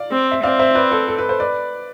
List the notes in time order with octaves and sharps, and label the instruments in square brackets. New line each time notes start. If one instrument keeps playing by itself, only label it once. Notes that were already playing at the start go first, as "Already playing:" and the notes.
Already playing: [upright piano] D5 F5
[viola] C4
[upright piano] E5
[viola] C4 [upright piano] D5 F5
[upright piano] C5 E5
B4 D5
A4 C5
A4
B4
A4 C5
B4 D5